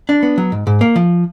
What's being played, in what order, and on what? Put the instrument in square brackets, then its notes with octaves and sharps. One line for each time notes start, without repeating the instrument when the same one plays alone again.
[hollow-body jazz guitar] D4
B3
F#3
G#2
G#2
A#3
F3